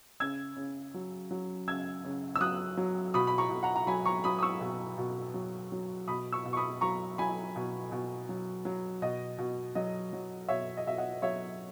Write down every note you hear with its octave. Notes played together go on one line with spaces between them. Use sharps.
C#3 E6 G#6
C#3
F#3
F#3
C#3 E6 G#6
C#3
E6
F#3 D#6 F#6
F#3
B2 B5 D#6
B5
A#5 C#6
B2
F#5 A#5
A#5
F#3 G#5 B5
A#5 C#6
F#3 B5 D#6
D#6
C#6 E6
B2
B2
F#3
F#3
B2 B5 D#6
C#6 E6
B2
C#6
B5 D#6
F#3 A#5 C#6
F#3 G#5 B5
B2
B2
F#3
F#3
B2 D#5
B2
F#3 D#5
F#3
B2 C#5 E5
D#5
B2 E5
D#5 F#5
F#3 C#5 E5